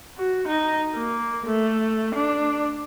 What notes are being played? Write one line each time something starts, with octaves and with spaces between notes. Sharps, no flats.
F#4
D#4
A#3
A3
D4